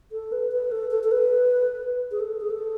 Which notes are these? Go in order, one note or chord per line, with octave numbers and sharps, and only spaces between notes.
A4
B4
B4
A4
A4
A4
B4
G#4
A4
G#4
A4